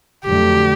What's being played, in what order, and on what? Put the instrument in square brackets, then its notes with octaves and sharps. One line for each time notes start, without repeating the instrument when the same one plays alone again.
[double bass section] F2 D3 F#3 A3 [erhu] G4